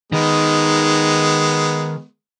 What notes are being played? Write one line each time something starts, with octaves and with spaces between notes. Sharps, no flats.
D#3 G#3 B3